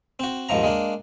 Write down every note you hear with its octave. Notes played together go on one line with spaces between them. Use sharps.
C4 F#4
A#1 D#2 G#2 F3 A#5
G#3 A#3 D4